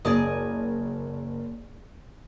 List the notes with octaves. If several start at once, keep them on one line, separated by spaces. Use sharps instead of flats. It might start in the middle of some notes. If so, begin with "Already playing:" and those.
F#1 G#4 D5 D#5